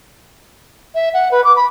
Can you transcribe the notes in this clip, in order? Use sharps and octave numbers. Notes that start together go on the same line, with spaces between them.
E5
F#5
B4
D6
B5